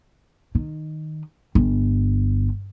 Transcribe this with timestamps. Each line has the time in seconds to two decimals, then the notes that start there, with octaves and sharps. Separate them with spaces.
0.55 D#3
1.55 G1